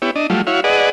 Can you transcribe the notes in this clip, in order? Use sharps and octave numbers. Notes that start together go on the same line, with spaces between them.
B3 E4 G4 C#5
D4 D#5
F#3 G3 A3 F4
E4 F#4 C#5 F5
G#4 B4 D5 D#5 F#5